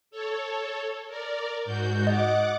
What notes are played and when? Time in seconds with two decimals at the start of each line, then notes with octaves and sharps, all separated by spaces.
0.11 A4 C#5
1.08 A#4 D5
1.65 G#2 F#4 G6
2.07 D#5 F#5 D6